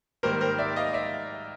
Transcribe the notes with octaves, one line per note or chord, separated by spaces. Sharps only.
G#2 D#3 G3 A#3 A#4 C5
A#4 C5
D5 E5
D#5 F5
D5 E5